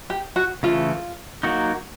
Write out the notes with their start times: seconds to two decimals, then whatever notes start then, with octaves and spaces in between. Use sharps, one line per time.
0.10 G4
0.36 F#4
0.63 C#3 E3 A3 F4
1.43 F#3 A#3 D#4 F#4